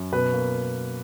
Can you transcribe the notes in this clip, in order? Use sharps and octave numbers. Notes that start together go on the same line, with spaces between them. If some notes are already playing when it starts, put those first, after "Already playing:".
Already playing: F#2
B2 B4
A#3